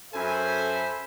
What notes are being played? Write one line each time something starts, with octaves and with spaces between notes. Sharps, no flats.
F#2 A4 C5 E5 G#5 B5